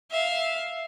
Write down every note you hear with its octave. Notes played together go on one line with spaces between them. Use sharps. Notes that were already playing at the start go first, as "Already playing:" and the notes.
E5 F5